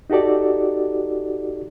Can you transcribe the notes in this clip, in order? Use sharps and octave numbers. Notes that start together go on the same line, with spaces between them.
D#4 F#4 G4 A4 D5